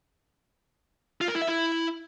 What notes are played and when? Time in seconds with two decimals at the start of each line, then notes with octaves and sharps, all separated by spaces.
1.21 F4
1.28 A#4
1.35 E4
1.42 E5
1.49 E4